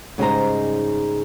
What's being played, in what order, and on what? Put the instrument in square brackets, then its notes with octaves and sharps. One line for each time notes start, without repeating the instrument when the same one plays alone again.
[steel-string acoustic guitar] G#2 C#3 G3 D#4 C5 A#5